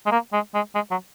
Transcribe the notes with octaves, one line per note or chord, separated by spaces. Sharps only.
G#3
A#3
G#3
G#3
G#3
F#3